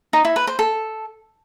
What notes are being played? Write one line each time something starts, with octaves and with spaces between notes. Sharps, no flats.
D#4
E4
B4
C5
A4